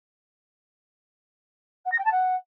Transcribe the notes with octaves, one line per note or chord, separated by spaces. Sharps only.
F#5
A#6
G5
A5
F#5